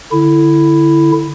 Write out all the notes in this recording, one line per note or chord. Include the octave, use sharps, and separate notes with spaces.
D3 E4